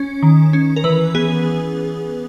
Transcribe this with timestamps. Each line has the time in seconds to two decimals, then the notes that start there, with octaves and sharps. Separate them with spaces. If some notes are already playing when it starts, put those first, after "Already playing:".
Already playing: C#4
0.23 D#3
0.53 C#4
0.76 A#4
0.84 E3 B4
1.15 B3 G#4